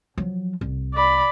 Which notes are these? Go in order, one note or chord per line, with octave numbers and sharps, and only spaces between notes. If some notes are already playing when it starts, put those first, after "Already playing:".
F3 F#3
C2
D5 B5